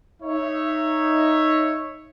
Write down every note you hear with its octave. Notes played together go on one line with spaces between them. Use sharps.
D#4 C#5 E5